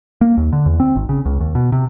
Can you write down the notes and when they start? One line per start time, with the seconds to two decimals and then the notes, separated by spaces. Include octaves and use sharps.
0.21 A#3
0.37 D#2
0.53 D3
0.66 E2
0.80 C4
0.96 G#1
1.09 C#3
1.25 C#2
1.40 D#2
1.55 B2
1.72 C3